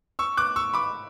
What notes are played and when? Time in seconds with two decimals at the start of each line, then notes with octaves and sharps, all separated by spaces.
0.19 C#6 E6
0.37 D6 F#6
0.56 C#6 E6
0.74 B5 D6